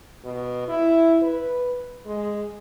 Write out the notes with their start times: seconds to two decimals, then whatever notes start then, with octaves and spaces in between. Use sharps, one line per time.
0.24 B2
0.68 E4
1.23 B4
2.06 G#3